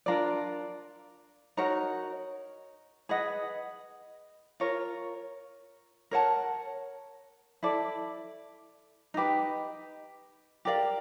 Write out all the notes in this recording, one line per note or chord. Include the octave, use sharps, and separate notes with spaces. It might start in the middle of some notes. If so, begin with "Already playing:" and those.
D4 F4 A#4 D5
D#4 F#4 A#4 C#5
G#4 B4 D#5 F#5
F4 A#4 C#5
A#4 C#5 F#5 A5
E4 A4 D5
D#4 G4 B4
G4 A#4 D5 F5